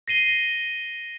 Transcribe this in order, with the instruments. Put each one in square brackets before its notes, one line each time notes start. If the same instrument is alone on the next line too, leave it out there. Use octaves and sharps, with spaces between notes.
[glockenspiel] A#6 C7 D#7 G7